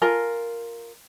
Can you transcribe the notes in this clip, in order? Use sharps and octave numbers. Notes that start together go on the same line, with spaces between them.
F4 A#4 G#5